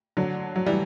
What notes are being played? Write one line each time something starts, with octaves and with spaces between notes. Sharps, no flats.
D3 F#3
F#3
E3 G3